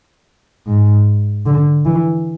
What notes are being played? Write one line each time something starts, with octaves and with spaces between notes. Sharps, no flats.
G#2
D3
E3